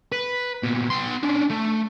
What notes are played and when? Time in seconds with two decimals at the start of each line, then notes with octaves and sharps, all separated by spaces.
0.12 B4
0.63 A#2 B3
0.90 B3 C6
1.23 C#4 D4
1.50 A3